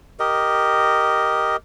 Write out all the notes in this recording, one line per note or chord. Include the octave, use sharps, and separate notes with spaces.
G4 A#4 D#5